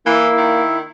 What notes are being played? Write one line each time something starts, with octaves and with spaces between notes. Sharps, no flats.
E3 A#3 E4
D#3